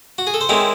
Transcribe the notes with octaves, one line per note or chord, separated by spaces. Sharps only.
F#4
G#4
A4
C5
D#3 G#3 C4 E4 C#5